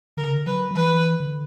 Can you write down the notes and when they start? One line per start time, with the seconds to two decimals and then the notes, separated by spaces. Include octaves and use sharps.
0.17 D3 A#4
0.25 C#3
0.34 D3
0.46 F#3 B4
0.71 F#3
0.76 E3 B4
1.20 D3